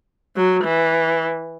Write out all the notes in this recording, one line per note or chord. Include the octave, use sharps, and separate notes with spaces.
F#3
E3